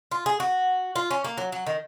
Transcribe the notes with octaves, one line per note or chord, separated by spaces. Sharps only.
F4
G#4
F#4
F4
C#4
A#3
F#3
F#3
D#3